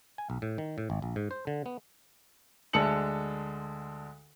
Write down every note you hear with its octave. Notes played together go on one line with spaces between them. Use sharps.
G#5
B1
A2
D#3
A2
G#1
A#1
G#2
C5
D3
B3
D2 D3 G#3 A5 C#7 F#7